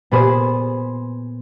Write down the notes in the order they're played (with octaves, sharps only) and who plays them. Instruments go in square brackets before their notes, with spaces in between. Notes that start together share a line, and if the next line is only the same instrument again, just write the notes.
[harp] A#2 B3 G#4 B4 C5 G#5